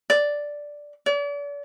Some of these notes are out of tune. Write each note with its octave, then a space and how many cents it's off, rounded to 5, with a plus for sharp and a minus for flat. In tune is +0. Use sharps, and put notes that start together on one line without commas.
D5 -5
D5 -40